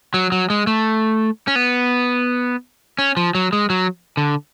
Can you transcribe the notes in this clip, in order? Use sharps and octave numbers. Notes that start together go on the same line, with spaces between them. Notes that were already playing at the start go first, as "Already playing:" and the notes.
F#3
F#3
G#3
A3
C#4
B3
C#4
F3
F#3
G#3
F#3
D3